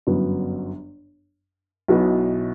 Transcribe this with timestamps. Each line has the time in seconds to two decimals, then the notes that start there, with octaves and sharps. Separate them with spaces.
0.07 G1 F#2 F#3 B3
1.88 B1 B2 F#3 B3 E4